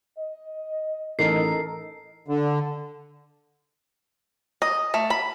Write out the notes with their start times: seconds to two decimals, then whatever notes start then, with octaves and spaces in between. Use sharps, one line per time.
0.19 D#5
1.19 A1 D#4 A4 A#4 C7
2.28 D3
4.62 D#5
4.94 A3
5.10 B5